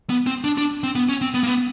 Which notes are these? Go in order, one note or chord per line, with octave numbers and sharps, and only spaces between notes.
B3
C4
D4
D4
C4
B3
C#4
C4
B3
A#3
B3